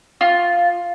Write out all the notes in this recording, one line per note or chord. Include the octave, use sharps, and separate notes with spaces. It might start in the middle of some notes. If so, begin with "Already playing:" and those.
F4